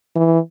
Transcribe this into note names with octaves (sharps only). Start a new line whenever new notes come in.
E3